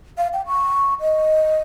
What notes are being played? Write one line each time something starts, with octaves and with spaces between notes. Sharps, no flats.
F5
G5
C#6
D#5